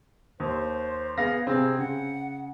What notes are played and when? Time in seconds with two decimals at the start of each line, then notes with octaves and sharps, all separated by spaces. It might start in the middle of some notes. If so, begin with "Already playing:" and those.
0.40 D#2 C5
1.18 B3 G#4 F5 A#6
1.47 C3 C4 G#4
1.78 C#3 F#5